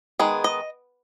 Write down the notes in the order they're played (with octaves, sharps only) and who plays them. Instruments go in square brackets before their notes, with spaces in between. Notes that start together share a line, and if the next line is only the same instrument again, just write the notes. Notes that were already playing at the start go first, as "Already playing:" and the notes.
[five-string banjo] D#3 G#3 B3 G#4
D#5